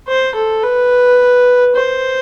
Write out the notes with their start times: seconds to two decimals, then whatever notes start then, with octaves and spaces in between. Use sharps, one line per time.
0.08 C5
0.35 A4
0.63 B4
1.76 C5